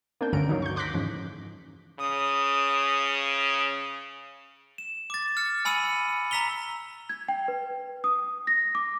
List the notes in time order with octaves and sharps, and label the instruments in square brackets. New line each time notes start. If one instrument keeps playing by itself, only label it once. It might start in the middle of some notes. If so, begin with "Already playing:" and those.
[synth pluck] A#3 C4 D4 G5
D2 G2 D3 C#4 A#5 D7
D#3 F#3 A#3
C#6 G6
C6 D6 F#6 G6 A#6 B6
F2 G#2 C#3 E3
[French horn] C#3 [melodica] D#6
[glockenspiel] E7
D6 A6
F6 C#7
G#5 B5 E6 C#7 D#7 F#7
A#5 E6 B6 F7 G7
[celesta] G#6
G5
B4
D#6
A#6
D6